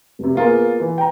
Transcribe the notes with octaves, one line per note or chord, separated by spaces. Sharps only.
F1 C3
A#3 B3 F4 G#4 A#4
E3
G5 A#5